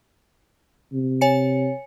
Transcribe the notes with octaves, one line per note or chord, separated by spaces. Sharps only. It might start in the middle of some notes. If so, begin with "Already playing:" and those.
C3
C#5 G#5 C#7